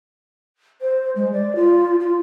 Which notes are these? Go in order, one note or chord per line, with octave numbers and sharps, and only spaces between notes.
C5
G#3
D5
F4
F4